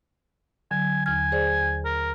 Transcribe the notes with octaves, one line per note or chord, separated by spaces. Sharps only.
D3 F#3 G#5
D#2 G#5 F6
G#4 C5 D5
D#2
A#4